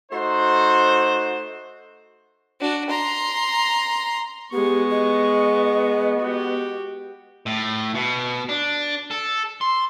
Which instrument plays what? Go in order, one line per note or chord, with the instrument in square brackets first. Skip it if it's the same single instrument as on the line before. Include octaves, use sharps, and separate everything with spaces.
[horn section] A3 D#4 F#4 C5
[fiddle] D4 F#4
A#5 C6
[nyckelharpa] G#3 C#6 [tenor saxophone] B3 [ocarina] G4
[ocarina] D#5
[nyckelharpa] F#4 G4
[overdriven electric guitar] A2
B2
D4
A4
C6